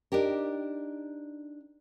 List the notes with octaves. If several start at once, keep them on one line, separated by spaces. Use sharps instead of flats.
D4 D#4 G4 A#4